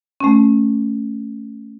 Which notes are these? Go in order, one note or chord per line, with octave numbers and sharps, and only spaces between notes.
A3 C#4